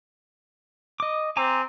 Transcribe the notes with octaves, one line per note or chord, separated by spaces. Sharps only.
D#5 D6
C4 G#5 A#5 D6